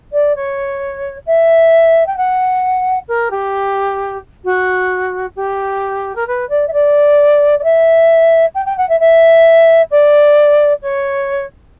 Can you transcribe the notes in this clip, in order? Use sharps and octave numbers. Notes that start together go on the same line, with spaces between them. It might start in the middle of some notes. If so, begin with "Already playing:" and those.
D5
C#5
E5
G5
F#5
A#4
G4
F#4
G4
A#4
B4
D5
E5
D5
D5
E5
G5
G5
F#5
E5
E5
D5
C#5